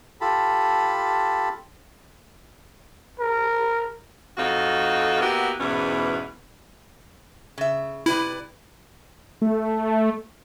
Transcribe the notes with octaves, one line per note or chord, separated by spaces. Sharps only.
F4 G4 A4 A5 B5
A#4
F2 D#4 F#4 A4 F5
A#3 B3 E4 F#4 G4
E2 G#2 B2 E3 C#4
C#3 E5
C3 E4 B4 D5
A3